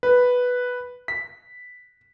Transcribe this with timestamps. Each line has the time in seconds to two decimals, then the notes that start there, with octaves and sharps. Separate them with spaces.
0.03 B4
1.08 B6